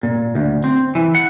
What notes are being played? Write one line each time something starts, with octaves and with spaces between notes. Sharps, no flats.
A#2
D2
C4
E3
F#5